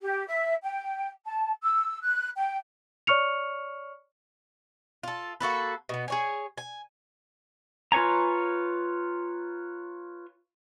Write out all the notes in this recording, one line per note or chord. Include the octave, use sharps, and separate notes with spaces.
G4
E5
G5
A5
E6
F#6
G5
C#5 D5 C#6 F6 C#7 F7
F4 A4
A#3 F#4 A4 B4
B2 B3
G#4 C#5 G#5
G#5
F4 B4 C#5 G#5 A#5